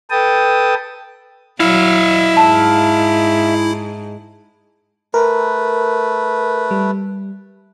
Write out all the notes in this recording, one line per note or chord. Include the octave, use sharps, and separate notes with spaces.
A4 B4 G5 A5 D#6
F#3 E4 E5 F5
G#2 A5
A3 A#4 B4
G3